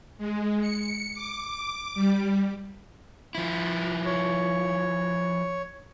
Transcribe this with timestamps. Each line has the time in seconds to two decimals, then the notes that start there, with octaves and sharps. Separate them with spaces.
0.18 G#3
0.61 C#7
1.14 D6
1.95 G3
3.35 F3 E4
4.06 C#5